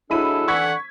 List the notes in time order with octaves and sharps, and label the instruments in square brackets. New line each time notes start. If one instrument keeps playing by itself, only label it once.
[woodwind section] F#3 G#3 D4 [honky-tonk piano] E4 B5 D#7 [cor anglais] A4
[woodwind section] D3 E3 [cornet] F#5 [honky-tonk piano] C#6 G#6 B6